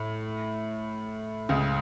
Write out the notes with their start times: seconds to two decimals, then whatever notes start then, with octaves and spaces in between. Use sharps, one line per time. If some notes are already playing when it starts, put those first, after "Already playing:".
Already playing: A2
1.49 C#2 C#3